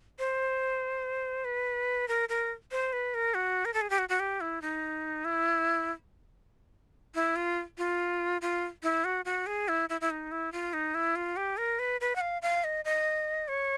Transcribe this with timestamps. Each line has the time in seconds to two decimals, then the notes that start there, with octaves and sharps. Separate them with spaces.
0.19 C5
1.45 B4
2.08 A#4
2.29 A#4
2.72 C5
2.93 B4
3.14 A#4
3.34 F#4
3.65 A#4
3.74 A4
3.81 G#4
3.90 G4
3.99 F#4
4.09 F#4
4.20 G4
4.41 E4
4.62 D#4
5.25 E4
7.15 E4
7.36 F4
7.78 F4
8.42 F4
8.83 E4
9.04 F#4
9.25 F#4
9.47 G#4
9.68 E4
9.89 E4
10.01 E4
10.10 D#4
10.32 E4
10.52 F4
10.73 D#4
10.95 E4
11.16 F4
11.37 G4
11.57 A#4
11.79 B4
12.01 B4
12.16 F#5
12.21 F5
12.42 F5
12.64 D#5
12.85 D#5
13.48 C#5